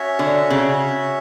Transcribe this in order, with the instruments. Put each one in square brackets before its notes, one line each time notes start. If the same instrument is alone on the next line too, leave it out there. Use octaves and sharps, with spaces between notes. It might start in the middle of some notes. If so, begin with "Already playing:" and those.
Already playing: [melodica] C#4 F#4 C#5 E5
[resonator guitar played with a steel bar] D3
C#3